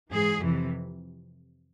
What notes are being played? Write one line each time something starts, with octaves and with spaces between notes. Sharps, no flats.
G#2 E3 G#4
F2 C3 E3